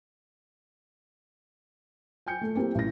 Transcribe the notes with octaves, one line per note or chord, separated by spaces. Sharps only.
G5 G#5 G6 C#7
A3 A4
A#3 C4 E4 G4
A1 E3 A#6